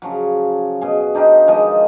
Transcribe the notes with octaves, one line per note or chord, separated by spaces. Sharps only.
C#3 F3 F#3
B2 G#4
D4 D#4 F4 G4
D#3 F3 G#3 D#5